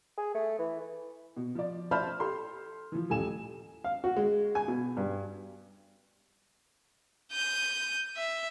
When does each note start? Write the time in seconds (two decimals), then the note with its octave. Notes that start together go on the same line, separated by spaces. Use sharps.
0.17 G#4
0.34 A3
0.59 E3
1.36 B2
1.55 F3 D5
1.91 C5 D5 E5 A5 B5 F6
2.20 G4 A4 C6
2.92 E3 F3
3.10 D#1 A2 A4 G#5 E7
3.84 F5
4.04 F#4
4.17 G#3
4.55 G#5
4.68 B2
4.97 G2
7.32 G6 D#7
8.17 E5